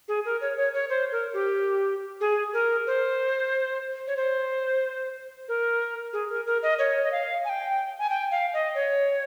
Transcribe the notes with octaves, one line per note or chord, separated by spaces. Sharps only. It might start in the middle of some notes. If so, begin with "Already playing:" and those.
G#4
A#4
C#5
C#5
C#5
C5
A#4
G4
G#4
A#4
C5
C#5
C5
A#4
G#4
A#4
A#4
D#5
C#5
D#5
F5
G#5
G5
G#5
G5
F5
D#5
C#5